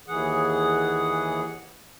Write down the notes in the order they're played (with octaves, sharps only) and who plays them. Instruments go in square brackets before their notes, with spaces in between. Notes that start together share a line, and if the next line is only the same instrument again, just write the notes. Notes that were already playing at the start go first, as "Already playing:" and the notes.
[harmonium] D#2 E3 G#4 F#5